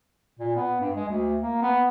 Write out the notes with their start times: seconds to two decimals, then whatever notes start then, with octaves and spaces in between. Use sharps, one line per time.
0.39 A#2
0.56 B3
0.80 G2
0.96 G#3
1.08 D2
1.41 A#3
1.62 B3